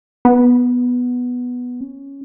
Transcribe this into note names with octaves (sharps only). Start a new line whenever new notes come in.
B3
C#4